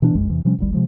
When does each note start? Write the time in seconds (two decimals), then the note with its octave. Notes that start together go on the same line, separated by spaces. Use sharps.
0.02 B2 E3 B3 D4
0.15 F1 A#1 F#2 G#3
0.30 E2 C3 E3
0.45 C3 F3 G3 C#4
0.58 D1 G#1 G3
0.72 C3 F3 G#3